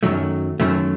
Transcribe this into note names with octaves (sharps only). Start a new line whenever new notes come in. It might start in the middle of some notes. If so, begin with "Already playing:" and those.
F#2 D#3 F#3 A3
F#2 D#3 F#3 A3